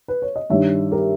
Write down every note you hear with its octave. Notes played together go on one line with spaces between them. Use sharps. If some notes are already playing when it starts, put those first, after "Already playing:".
B4
C#5
D#5
G2 D#3 G3 C#5 E5
G4 A#4